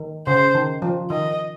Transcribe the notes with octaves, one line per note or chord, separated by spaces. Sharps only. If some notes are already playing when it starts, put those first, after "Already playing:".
Already playing: D#3
C#3 C5
D#3
F3
D#3 D#5